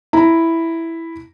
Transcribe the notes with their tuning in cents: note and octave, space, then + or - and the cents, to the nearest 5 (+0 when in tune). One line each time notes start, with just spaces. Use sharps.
E4 +0 A#5 +0